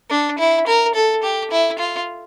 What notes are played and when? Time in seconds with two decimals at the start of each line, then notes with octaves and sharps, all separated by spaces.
0.10 D4
0.39 E4
0.67 A#4
0.95 A4
1.23 G4
1.51 E4
1.79 F4